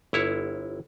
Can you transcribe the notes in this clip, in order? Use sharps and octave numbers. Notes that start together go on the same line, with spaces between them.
G1 E4 C#5